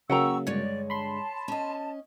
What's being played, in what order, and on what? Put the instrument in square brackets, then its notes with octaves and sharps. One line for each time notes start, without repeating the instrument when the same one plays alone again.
[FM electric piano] C#3 F#3 A#3 [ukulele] F#5 G5 A#5 [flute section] C#6 E6
[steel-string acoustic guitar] G2 D3 G#3 [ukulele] C#5 [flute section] D5
[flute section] A5 [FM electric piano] B5 C6
[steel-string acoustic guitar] C#4 D#5